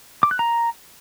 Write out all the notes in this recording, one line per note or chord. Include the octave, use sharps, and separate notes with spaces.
D6
F#6
A#5